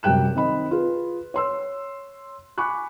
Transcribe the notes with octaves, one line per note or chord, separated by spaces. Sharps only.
F#2 C3 G3 G5 F#6 E7
D#3 C4 D#5 B5
F4 G#4 B4
C#5 C6 E6
G#5 B5 C#6 D6 F#6